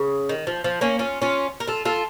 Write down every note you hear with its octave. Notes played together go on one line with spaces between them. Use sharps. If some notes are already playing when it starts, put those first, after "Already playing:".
Already playing: C#3
D#3
F3
F3
A#3 C#4
C#4 F4
C#4 F4
A#4
F4 A4
F4 A4